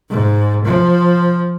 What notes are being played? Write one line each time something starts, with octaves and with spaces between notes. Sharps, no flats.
G#2
F3